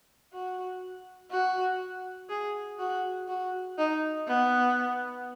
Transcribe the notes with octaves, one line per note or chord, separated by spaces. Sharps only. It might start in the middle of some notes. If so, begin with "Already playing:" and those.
F#4
F#4
G#4
F#4
F#4
D#4
B3